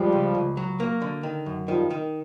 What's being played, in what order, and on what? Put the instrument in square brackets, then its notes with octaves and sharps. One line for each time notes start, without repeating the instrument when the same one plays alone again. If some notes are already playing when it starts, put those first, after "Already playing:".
Already playing: [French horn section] F3 G3 [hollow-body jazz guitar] G#3
[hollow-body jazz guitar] C#2
C#2
F#3
A#3
D3
D#3
F#2
[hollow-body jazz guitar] D#3 [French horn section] F3 G3
[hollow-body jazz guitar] D#3